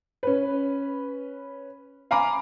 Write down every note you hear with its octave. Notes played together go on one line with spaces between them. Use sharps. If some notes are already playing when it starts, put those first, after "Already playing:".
C#4 B4
F5 G#5 A#5 B5 D6